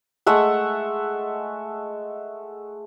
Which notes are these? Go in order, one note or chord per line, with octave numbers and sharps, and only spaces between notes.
G#3 A3 E5 F#5